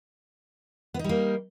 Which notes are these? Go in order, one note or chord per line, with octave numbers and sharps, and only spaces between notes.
G3 A#3 B3 D#4